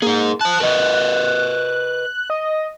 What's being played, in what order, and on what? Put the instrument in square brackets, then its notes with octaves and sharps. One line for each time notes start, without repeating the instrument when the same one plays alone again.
[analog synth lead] A#3 [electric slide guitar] D#4 G#4
[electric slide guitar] C5 A5 [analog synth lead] F#6
[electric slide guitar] A#4 B4 D#5
[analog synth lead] D#5